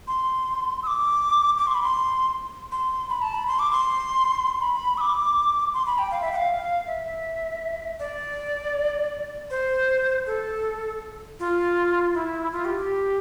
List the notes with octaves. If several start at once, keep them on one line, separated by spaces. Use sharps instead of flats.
C6
E6
D6
D6
C6
B5
C6
C6
B5
A5
B5
C6
D6
C6
B5
E6
D6
C6
B5
G5
F5
E5
G5
F5
E5
D5
C5
A4
F4
E4
F4
G4
G4